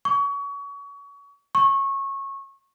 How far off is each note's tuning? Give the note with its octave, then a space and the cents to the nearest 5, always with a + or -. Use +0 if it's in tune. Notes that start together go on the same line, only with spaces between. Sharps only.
C#6 +30
C#6 -20